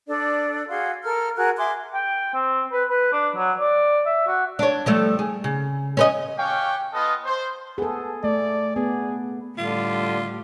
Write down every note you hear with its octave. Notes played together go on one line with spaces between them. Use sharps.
D4 A4 D5
F#4 G#4 F5 C6
A4 A#4 A#5 F6
F#4 G#4 A#4 F#6
G#4 E5 C6 D6
G5
C4
B4
B4
D4
F#3
D5
E5
F#4
D4 C#5
F3 G3 A3
G#4
C#3
C#4 B4 D#5
C#4 F#4 G4 F5 G5 C#6
B3 F4 A4 D#5
C5
B3 G#4 A4
A3 D5
B3 G#4
A2 D3 G3 F4